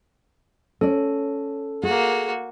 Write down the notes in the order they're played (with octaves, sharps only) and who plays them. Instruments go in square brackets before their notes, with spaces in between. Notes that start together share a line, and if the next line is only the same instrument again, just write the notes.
[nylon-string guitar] C#4 D5 [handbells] A4
[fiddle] A#3 F#4 [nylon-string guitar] G#4